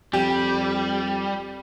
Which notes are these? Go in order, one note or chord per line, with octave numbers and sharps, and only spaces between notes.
F2 G3 G4